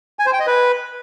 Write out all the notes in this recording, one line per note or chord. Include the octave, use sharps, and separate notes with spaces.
G#5
C5
G5
D#5
B4